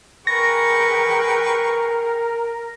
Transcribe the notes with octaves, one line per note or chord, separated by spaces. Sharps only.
G#4 A#4 B4 G5 C#6 A#6